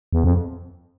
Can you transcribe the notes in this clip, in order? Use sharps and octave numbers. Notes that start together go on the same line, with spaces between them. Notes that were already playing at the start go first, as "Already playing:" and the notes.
E2
F2